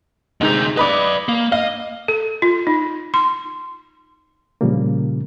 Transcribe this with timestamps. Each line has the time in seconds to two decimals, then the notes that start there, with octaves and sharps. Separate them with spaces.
0.41 D2 C3 D#3 G#3 D#4
0.77 B4 D5 D#5 B5 D6
1.29 A#3
1.52 D#5 F5
2.08 A4
2.42 F4
2.67 D#4
3.14 C6
4.61 A#2 C#3 F3 G3 A#3